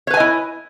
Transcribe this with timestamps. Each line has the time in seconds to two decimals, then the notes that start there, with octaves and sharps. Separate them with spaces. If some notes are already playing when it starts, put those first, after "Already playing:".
0.07 C#5
0.10 B4
0.14 G#5
0.17 D#5
0.20 E4